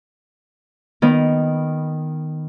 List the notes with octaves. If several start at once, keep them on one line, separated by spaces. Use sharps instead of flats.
D#3 B3